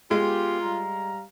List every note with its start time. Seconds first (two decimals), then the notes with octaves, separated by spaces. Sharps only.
0.11 G#3 B3 F4 G4
0.61 G3 F5 A#5